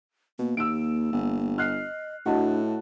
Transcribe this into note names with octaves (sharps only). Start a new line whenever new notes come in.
B2 A#3
D#2 E6 D7
G1
D#5 F6 F#6 C7
A2 D4 F#4 D#5 A5